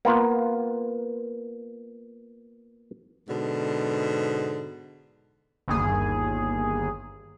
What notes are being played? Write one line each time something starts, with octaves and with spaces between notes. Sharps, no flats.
A#3 B3 F4
G#2 B2 D3
G1 D#2 G#4